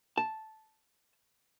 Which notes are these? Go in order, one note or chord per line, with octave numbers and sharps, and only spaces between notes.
A5